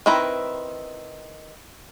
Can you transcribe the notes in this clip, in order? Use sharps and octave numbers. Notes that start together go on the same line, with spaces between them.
D#3 C4 E4 B4 A#5